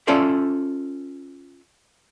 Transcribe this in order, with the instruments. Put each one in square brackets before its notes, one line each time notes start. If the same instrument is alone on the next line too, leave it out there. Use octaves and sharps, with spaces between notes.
[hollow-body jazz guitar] C#4 F4 A4 C5 D5 E5